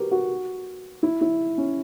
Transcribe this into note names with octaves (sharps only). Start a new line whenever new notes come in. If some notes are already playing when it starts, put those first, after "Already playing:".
Already playing: F#4 G4 A#4 B4
F#4
E4
E4
C#4